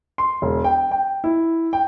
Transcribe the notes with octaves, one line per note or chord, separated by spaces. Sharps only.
C6
E1
G5
G5
E4
G5